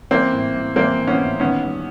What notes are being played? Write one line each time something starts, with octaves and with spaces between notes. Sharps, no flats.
E3 A#3 C4
A2
A2
E3 A#3 C4
E3
B3 C#4
A2
D#3 B3 C#4
G2